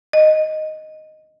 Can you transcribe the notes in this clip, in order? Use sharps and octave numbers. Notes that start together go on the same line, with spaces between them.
D#5